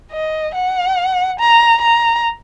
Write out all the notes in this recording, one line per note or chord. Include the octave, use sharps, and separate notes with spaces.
D#5
F#5
A#5
A#5